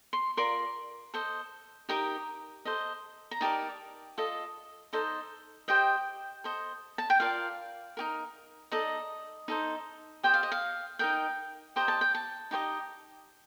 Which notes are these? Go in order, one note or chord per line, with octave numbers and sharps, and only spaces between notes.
C6
F4 A#4 D5 C6
A4 C5 D#5
D#4 G4 A#4 D#5 A#5
A4 C5 D#5
A#5
D#4 G4 A#4 D5 A5
F4 A4 D#5
D#4 A4 C5 D#5
G4 C5 D#5 G5
A4 C5 D#5
A5
G5
F4 A#4 D5 F5
D#4 G4 A#4
D#4 A4 D5 D#5
D#4 A4 C5
G4 C5 D#5 G5
F5
D#5
F5
D#4 A#4 D#5 G5
G4 C5 D#5 A#5
A5
G5
A5
D#4 G4 C5 D#5